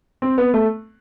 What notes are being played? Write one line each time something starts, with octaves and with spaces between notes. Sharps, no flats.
C4
B3
A3